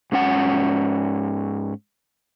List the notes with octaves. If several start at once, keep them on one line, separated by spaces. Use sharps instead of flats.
G#2 C#4 F#5